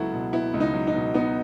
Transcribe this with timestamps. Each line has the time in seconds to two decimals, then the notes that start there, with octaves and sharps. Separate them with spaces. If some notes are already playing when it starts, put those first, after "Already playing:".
Already playing: C#2 F#3 B3 E4 F#4 A4
0.12 B2
0.33 B3 E4
0.54 C#2
0.60 D#4
0.74 F#3
0.87 D#4
0.95 B2
1.14 B3 D#4